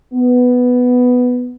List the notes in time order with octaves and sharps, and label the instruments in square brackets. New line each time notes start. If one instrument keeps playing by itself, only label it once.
[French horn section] B3